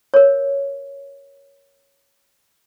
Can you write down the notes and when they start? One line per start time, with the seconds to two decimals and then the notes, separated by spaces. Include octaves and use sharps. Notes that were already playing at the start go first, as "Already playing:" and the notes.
0.14 A#4 C#5